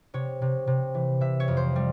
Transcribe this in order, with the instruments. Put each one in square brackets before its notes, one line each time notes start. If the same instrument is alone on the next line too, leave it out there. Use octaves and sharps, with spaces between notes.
[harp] C3 C#5
C3
C3
E3
C3 E5
C#5
F2
C5
G3